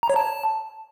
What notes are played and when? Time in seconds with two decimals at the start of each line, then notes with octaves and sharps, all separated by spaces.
0.03 A#5
0.10 C#5
0.16 A5